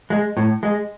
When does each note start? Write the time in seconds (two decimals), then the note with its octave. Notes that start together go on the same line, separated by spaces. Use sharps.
0.10 G#3
0.37 A2
0.63 G#3